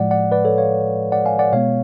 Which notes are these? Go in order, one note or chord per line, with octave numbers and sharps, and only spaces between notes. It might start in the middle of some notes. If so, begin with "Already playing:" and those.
Already playing: A2 F3 G#3 D5 F#5
D5 F#5
B4 D5
A4 C#5
C#5 F5
D5 F#5
F5 G#5
D5 F#5
B2 G#3 B3 C#5 F5